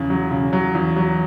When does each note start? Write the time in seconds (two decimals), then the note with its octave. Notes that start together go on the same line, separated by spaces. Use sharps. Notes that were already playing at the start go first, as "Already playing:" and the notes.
Already playing: E2 C#3
0.10 F#3
0.31 C#3
0.53 F#3
0.75 E2
0.96 F#3